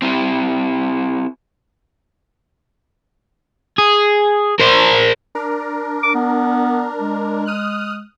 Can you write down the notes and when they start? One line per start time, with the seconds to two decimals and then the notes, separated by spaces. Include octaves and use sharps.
0.02 C4 E4 G4
3.78 G#4
4.60 A#4 C5
5.35 D4 A#4
6.03 D6
6.14 B3
7.00 G#3
7.46 D#6 F6 F#6